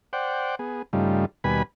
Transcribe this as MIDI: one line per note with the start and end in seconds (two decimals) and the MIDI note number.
0.13 0.55 72
0.13 0.55 74
0.13 0.55 78
0.13 0.55 79
0.59 0.82 59
0.59 0.82 68
0.93 1.25 43
0.93 1.25 49
0.93 1.25 55
0.93 1.25 57
0.93 1.25 63
0.93 1.25 65
1.44 1.63 39
1.44 1.63 47
1.44 1.63 55
1.44 1.63 71
1.44 1.63 80
1.44 1.63 83